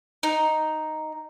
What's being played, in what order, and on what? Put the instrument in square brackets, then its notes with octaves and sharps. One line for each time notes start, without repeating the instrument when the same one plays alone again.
[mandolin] D#4